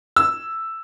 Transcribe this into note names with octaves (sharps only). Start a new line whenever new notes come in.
E6